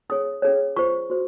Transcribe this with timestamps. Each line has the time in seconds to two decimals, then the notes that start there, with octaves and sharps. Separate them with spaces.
0.10 C#4 G#4 C#5 D#6
0.42 C#4 G#4 C#5
0.77 F4 C5 C#6
1.10 F#4 C5